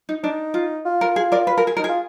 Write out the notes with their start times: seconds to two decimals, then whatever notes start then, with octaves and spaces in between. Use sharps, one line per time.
0.09 D#4
0.23 D4 D#4
0.54 F4
0.85 F4
1.01 A#4
1.16 G#4
1.32 A#4 D5
1.47 B4
1.58 A#4
1.67 G#4
1.77 D#4 A#4
1.84 F4 G#4